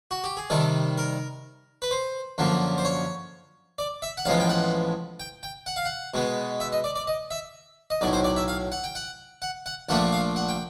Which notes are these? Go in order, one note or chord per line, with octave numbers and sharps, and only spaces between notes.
F#4
G4
G#4
C3 D#3 G3 A4
A#4
B4
C5
F#2 D3 F3 A#3
C5
C#5
D5
E5
F#5
A1 A2 F3 G#3 B3 F5
G5
F#5
G5
G5
F#5
F5
F#5
B2 G#3 B3
E5
D#5
D5
D5
D#5
E5
D#5
B1 A2 F#3 D5
C5
D5
E5
F5
F#5
G5
F#5
F#5
F#5
A#1 A#2 F3 A3 D4 F#5
F5
F#5
G5